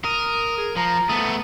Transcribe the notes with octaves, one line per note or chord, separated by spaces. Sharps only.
A#4 D#6
G#4
F3 A#5
A3 B3 D#6